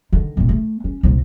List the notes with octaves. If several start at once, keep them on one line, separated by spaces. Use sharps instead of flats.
D3 D#3
C2 A#2
A3
C#4
C2 A#2